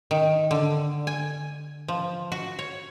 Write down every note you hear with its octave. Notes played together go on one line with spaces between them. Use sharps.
D#3
D3
G#5
F3
F#4
C#5